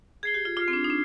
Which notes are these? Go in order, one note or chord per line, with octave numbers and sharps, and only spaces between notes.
G#4 G#6 C7 G7
G4
F4
F4 D6 F6 C7
C4
D4
D#4
D4